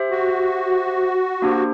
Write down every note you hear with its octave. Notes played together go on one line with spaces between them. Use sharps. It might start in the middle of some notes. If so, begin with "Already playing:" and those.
Already playing: G4 C5 E5
F#4
A#3 D4 G4 C5